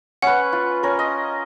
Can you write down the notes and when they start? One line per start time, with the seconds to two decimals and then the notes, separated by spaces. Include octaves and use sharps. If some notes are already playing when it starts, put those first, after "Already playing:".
0.22 C#4 B4 F#5
0.53 F4
0.83 C#4 A#4
0.99 D#5